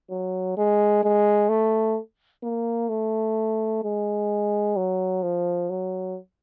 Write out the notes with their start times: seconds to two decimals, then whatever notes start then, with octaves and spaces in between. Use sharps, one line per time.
0.10 F#3
0.57 G#3
1.03 G#3
1.49 A3
2.43 A#3
2.89 A3
3.84 G#3
4.76 F#3
5.23 F3
5.69 F#3